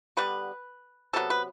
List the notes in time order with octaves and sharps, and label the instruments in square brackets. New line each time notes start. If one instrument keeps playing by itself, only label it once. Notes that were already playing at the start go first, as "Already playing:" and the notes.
[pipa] D3 G3 B3 B4
C3 F#3 B3 A4
B4